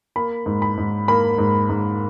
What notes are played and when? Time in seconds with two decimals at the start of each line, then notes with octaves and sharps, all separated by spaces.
0.16 A#3 B5
0.46 G#2
0.62 B5
0.77 G#2
1.08 A#3 B5
1.38 G#2
1.69 G#2